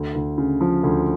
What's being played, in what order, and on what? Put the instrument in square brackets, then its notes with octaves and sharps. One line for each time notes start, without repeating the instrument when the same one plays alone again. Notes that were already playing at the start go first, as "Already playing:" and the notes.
Already playing: [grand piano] D2
D2
C#3
F3
D2